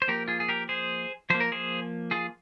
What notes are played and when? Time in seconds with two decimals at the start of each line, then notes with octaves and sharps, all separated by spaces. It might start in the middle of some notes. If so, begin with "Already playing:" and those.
0.02 C5
0.08 F3 A#3 G4 A#4
0.28 F4 G#4
0.40 G#4
0.49 G4 A#4
0.69 G#4 C5
1.30 F3 A#3 C5
1.40 A#4
1.52 G#4 C5
2.11 F4 G#4